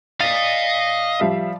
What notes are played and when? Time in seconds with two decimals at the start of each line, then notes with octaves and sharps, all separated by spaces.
0.21 D5 D#5 F5 A6
1.20 F3 G3 E5